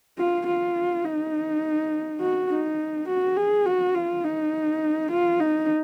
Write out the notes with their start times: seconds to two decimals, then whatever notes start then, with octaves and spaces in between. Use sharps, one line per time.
0.18 F4
0.47 F4
1.05 D#4
2.21 F#4
2.50 D#4
3.08 F#4
3.37 G#4
3.66 F#4
3.94 F4
4.24 D#4
5.10 F4
5.40 D#4